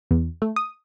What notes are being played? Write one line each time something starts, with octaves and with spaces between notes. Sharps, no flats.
E2
A3
D#6